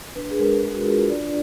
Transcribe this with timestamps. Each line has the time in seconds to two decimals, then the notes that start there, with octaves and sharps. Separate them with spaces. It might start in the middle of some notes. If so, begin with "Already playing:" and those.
0.16 D4 B4
0.31 G#4
0.38 G#3 A#4
0.63 G#3 G#4
0.74 F#4
0.86 F4 G#4
0.98 B4
1.09 D4 D5